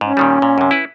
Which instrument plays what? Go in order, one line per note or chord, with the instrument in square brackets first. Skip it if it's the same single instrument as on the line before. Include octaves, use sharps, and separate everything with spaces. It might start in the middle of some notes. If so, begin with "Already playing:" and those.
[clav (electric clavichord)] G#2 [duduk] C#4
[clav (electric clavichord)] A#2 D#3 G3
A#2
F#2 C3
E4 B4